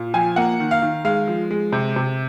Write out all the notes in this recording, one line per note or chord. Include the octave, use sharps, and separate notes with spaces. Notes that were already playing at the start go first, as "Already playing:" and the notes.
Already playing: A#2
F3 G#5
A#3 F#5
D#3
F5
D#3
G#3 F5
F3
G#3
C3
C3